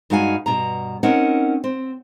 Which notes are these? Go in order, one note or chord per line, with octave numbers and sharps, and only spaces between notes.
G2 G#3 D#4 F#4 F5 G#5
G2 B2 A#5
C4 C#4 D#4 A#4 F#5
C4